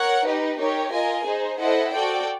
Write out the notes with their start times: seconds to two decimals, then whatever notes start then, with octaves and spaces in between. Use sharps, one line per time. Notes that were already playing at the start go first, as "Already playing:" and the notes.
Already playing: A#4 C#5 F#5
0.25 D#4 G4 B4
0.58 D#4 G4 A#4 C#5
0.91 F4 A#4 D#5 G#5
1.25 D#4 G#4 C5
1.58 E4 A4 C5 D#5 F#5
1.90 F#4 A4 D5 G5